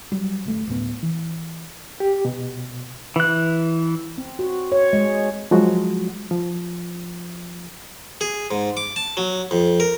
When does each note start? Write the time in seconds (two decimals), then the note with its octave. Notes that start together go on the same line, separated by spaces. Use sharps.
0.12 F#3 G3
0.45 G1 A3
0.67 D1 A2 B3
1.03 E3
2.00 G4
2.25 B2
3.16 E3 F#6
4.18 C4
4.39 F#4
4.72 C#5
4.93 G#3
5.51 F3 F#3 G#3 F#4
6.31 F3
8.21 G#4
8.51 G#2
8.77 D6
8.96 A5
9.17 F#3
9.51 F2
9.80 A#4